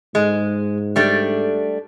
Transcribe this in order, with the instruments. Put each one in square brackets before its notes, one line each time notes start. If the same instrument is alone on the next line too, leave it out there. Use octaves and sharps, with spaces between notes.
[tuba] G#2 [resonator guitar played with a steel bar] G#3
[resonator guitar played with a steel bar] G3 A3 D4